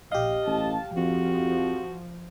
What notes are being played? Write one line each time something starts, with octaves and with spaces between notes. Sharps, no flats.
A#1 G4 D#5 F5
A1 A5
F2 F3 F#4